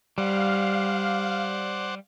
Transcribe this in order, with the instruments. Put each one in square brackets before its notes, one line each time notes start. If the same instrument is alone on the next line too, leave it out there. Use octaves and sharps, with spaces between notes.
[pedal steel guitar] G3 [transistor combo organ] C5 D5 F#5 [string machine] F5